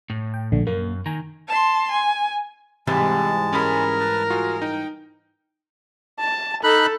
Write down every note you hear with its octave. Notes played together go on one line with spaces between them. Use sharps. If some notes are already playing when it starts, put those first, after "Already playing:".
A2
G5
A#1 D3 A3
F#2 A#3
D#3 G#5 A#5
A5 C6
G#5
G#2 C3 E3 G3 G#3 A5
C#4 G#4 A#4 B5
B4 A5
F4 F#4 G#4
D#4 G5
A5
D#4 A4 B5 F#6